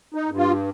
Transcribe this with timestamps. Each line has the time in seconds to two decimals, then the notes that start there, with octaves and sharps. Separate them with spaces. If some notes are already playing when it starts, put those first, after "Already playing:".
0.14 D#4
0.27 G2
0.37 F4